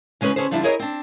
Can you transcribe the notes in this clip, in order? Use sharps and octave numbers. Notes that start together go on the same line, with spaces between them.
C#3 G#3 C#4 D#4 B4
D3 C#4 G#4 B4 C5
D3 F3 G3 D4 E4
E4 G#4 A#4 C#5 D#5
C4 D4